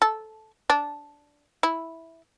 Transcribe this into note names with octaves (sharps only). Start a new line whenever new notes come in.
A4
D4
E4